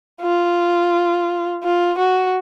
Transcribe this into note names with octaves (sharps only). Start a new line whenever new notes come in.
F4
F4
F#4